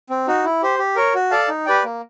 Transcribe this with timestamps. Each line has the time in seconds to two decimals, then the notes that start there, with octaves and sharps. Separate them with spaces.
0.10 C4
0.28 D#4 F#4
0.44 E4
0.62 G4 C5
0.79 G4
0.96 A#4 C#5
1.15 F#4
1.31 A4 D5 F5 A5
1.49 D#4
1.66 G4 B4 D5 G5
1.84 A#3